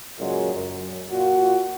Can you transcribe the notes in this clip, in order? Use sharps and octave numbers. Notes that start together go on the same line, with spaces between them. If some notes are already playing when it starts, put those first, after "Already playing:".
F#2 A#2 C#3 F#3 G#3
F#2
A#2 F4 F#4